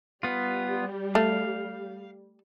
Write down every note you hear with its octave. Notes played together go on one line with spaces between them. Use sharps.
G3 B3 F4
A3 F5